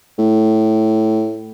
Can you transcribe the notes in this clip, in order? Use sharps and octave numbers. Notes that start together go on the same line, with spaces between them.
A2